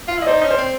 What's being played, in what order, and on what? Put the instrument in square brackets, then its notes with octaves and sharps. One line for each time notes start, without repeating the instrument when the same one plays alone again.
[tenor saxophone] F4
[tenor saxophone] E4 [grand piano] D#5
[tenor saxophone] D#4 [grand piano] C5 D5
[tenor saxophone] C#4 [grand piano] D#5
[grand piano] C5 D5
[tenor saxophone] C4